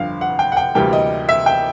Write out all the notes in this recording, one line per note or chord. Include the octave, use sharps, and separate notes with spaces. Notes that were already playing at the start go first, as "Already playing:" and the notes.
Already playing: G1 F2 D3 F3 F5
F#5
G5
F#5
G5
D2 C3 E3 G3 A#3 G5
D#5
E5
G5